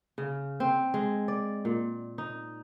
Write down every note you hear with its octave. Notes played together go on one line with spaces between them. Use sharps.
C#3
C4
G#3
D5
A#2
D#4